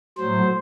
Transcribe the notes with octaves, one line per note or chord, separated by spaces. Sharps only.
A2 F#3 C5